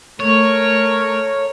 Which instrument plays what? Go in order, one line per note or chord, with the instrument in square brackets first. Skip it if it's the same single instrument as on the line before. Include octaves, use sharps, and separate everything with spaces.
[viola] A3 A#4 [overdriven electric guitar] C#5